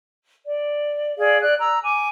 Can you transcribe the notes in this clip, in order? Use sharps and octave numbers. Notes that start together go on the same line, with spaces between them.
D5
G#4 D5 F5
D5 F#6
A#5 E6
G#5 D6